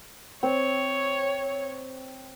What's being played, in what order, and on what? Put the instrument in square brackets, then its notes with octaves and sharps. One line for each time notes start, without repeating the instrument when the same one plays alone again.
[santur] C4 [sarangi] C#5